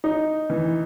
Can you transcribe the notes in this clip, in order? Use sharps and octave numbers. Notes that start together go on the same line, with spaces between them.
D#4
E3